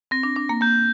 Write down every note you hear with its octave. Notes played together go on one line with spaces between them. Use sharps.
C4 A#6
D4
D4 A#6
A#3
A#3 G6